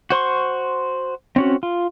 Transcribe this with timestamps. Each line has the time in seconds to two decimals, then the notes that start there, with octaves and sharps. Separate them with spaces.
0.10 F#4 C5 C6 C#6
1.36 C4 C#4 F#4
1.63 F4